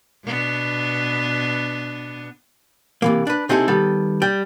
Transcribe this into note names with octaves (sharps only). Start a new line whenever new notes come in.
B2 B3 D4
C3 E3 A#3
D4 B4
C3 C4 D#4 E4 G#4 A4
D#3 G3 B3 A4
G3 G5